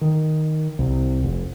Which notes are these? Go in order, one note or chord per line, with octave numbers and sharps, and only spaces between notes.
D#3
C2
F1